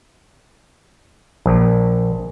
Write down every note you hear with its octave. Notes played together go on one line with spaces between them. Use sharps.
A#1